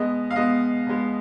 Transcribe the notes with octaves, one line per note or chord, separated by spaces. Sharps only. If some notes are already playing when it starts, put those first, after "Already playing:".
Already playing: B2 G#3 B3 D#5
F5
B2 G#3 B3 D#5
B2 G#3 B3